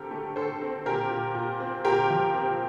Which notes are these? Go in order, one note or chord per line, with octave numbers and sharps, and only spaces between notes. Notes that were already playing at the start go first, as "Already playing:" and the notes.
Already playing: D3 C4 G4 A4 A#4
A3
D3 A4 C5
C4
A#2 G4 A#4
A#2
A#2
C4
A#2 G4 A#4
F3
C4